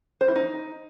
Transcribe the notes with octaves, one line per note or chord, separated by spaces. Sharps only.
C5
E4
D#4